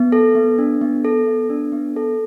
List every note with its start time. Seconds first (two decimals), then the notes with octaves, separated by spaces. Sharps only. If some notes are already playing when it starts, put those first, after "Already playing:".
Already playing: B3
0.12 A4
0.35 B3
0.58 D4
0.81 B3
1.05 A4
1.26 B3
1.50 D4
1.72 B3
1.96 A4